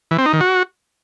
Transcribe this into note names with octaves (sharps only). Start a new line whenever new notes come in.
E3
C4
D#4
D#3
F#4